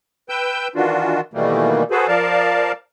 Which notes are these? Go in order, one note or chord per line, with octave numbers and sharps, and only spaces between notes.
B4 G5 E6 G6
D#3 E3 D4 F4 F#4
B2 D#3 E3 G3 A3 A#3
F#4 G#4 A4 B4 C5
F3 A#4 D5 F5 A5